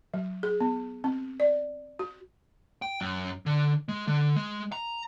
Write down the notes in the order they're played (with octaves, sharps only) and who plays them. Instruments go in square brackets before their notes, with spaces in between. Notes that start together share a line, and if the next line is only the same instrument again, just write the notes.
[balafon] F#3
G#4
B3
C4
D5
F#4
[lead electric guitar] G5
F#2
D3
G#3
D3
G#3
A#5